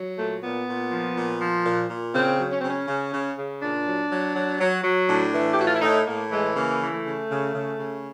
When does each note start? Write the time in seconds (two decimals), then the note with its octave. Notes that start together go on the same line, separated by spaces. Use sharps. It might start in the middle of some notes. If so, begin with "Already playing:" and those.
Already playing: F#3
0.18 A#2 A3
0.42 A#2 B3
0.67 A#2
0.92 F3
1.16 A#2
1.41 F3
1.65 A#2
1.89 A#2
2.14 C#3 C4
2.39 F#3
2.51 C#4
2.60 C#3 C4
2.69 C#4
2.87 C#3
3.12 C#3
3.37 C#3
3.61 A#2 D4
3.86 F#3
4.10 F#3
4.35 F#3
4.60 F#3
4.84 F#3
5.09 A2 D4
5.33 E3
5.53 G4
5.57 A2 F#4
5.67 F4
5.75 E4
5.82 A2 D#4
6.07 A2 A#3
6.31 E3 G#3
6.56 C#3 A#3
6.81 E3
6.92 A3
7.05 C#3
7.29 C#3
7.54 C#3
7.78 C#3